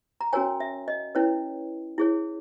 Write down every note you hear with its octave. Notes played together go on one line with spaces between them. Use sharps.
A#5
C#4 F#4 A#4 C#5 G#5
E5
D#5
C#4 E4 B4 C#5
E4 G#4 C#5